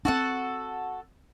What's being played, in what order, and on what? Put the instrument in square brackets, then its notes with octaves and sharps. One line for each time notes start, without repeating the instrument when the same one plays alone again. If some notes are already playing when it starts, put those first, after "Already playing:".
[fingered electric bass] C4 D4 [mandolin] F#4 A4 F#5